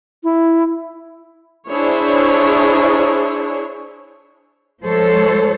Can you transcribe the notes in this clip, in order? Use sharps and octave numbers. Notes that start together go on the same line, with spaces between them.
E4
D4 E4 G#4 C5 C#5
F3 G#3 A4 C5 C#5